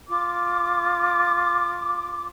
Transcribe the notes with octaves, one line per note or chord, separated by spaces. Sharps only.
F4 D6